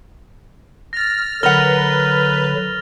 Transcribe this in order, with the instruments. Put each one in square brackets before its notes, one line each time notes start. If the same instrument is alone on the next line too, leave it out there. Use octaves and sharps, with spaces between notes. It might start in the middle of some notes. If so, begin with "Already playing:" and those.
[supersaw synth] F6 [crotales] A6 A#6
[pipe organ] D3 F#3 [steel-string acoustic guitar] A#4 F#5 [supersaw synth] B4 [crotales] F6 A6 F7